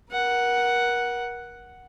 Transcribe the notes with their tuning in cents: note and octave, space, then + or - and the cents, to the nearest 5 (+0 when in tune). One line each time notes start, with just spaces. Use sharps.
A#4 +35 F#5 +0